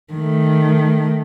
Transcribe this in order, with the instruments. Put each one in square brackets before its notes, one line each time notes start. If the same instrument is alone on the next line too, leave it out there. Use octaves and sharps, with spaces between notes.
[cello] D#3 A3